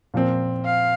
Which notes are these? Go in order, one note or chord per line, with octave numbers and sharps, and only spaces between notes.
A#2 F3 C4
F5